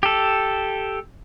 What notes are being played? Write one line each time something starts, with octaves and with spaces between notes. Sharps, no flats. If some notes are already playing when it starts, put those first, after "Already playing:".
G4 A4